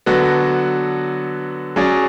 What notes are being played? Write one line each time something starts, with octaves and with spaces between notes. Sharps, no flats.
D3 F#3 B3 F#4 A4
F#3 C#4 G#4 D5